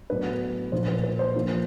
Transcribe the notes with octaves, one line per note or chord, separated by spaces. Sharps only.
A2 F#3 B3 D4 B4
A#2 F3 A#3 D4 F4 C5
B4
B4
C5
F3 A#3 D4 F4